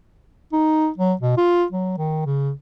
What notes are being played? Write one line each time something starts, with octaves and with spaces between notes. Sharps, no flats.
D#4
F#3
B2
F4
F#3
D#3
C#3